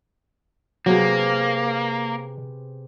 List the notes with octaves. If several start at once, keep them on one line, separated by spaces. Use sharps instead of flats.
C3 F#3 A#3 B3 G#4